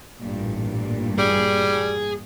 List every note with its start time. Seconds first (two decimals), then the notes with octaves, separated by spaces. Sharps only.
0.22 A1 G2 A#2
1.19 G3 G#4